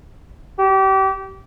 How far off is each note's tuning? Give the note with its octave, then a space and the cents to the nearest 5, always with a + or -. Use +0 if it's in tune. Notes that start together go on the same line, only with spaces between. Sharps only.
G4 -30